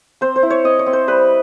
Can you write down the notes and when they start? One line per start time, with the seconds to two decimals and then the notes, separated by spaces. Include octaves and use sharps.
0.21 C4 C5
0.36 C5
0.43 E4
0.50 C#5
0.64 C4 D#5
0.79 C#5
0.86 C4
0.93 C5
1.08 G3 B4